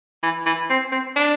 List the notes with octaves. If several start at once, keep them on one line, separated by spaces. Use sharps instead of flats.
E3
E3
C4
C4
D4